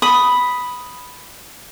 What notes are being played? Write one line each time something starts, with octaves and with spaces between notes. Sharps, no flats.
B5 D#6